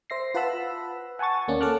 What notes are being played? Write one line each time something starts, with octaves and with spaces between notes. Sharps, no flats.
C5 E5 A#6 C7
F4 B4 F#5 A5 B5 E6
F#5 G#5 A5 C#6 A6
D#2 A#3 C#4 D5
A4 C#5 A5 D6 F6 F#6